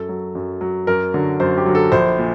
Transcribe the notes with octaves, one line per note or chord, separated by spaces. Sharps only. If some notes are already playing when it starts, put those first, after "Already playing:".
Already playing: F#2 A4
F#3
F#2
F#3
F#2 A#4
D3 F#3
F#2 C5
G4
D3 F#3
A4
A#1 C5
A#2